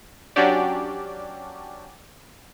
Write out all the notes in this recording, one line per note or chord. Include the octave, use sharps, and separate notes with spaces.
F#3 C#4 D4 F#4 G4 D5